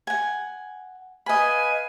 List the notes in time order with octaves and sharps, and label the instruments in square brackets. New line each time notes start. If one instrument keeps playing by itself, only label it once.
[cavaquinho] F#5 G#5
[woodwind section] B4 F5 G#5 [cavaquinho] D#5 B5